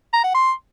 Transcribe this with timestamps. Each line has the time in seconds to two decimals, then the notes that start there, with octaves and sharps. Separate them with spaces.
0.13 A#5
0.24 F#5
0.34 C6